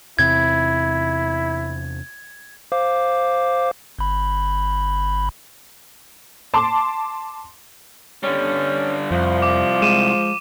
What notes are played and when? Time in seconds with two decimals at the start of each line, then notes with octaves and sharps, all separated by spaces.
0.19 E2 C3 C4 E4 G#6
2.72 C5 F5 D6
3.99 G1 B5
6.54 A5 C6 D6
8.23 D3 G3 C#4
9.11 C2 F2 F3
9.42 D6
9.82 G#3 D6 D#7 E7